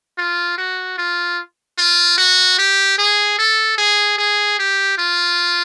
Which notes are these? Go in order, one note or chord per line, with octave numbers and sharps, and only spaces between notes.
F4
F#4
F4
F4
F#4
G4
G#4
A4
G#4
G#4
G4
F4